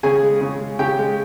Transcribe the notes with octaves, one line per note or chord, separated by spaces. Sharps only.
C#3 G#4 G#5
G#3
C#3
G#3
C#3 G4 G5
G#3